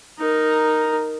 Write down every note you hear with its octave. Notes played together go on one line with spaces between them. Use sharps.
D#4 A#4